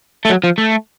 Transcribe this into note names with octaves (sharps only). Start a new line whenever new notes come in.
A3
F#3
F3
A3